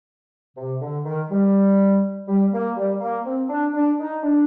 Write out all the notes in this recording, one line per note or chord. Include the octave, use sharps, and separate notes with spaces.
C3
D3
D#3
G3
G3
A#3
G3
A#3
C4
D4
D4
D#4
D4